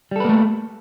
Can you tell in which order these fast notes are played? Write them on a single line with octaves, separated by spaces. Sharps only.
G3 A4 B4 A#3 A3